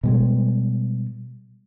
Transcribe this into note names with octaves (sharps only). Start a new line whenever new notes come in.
B2 G3 G#3